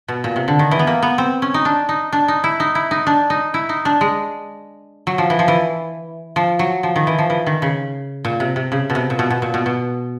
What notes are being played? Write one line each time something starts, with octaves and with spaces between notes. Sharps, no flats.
B2
A#2
C3
D3
D#3
E3
B3
A#3
B3
C4
C#4
D#4
D4
D#4
D4
D#4
E4
D#4
E4
D#4
D4
D#4
E4
D#4
D4
G#3
F#3
F3
E3
F3
E3
F3
F#3
F3
D#3
E3
F3
E3
D#3
C#3
A#2
C3
C3
C#3
B2
C3
A#2
B2
B2
A#2
B2
B2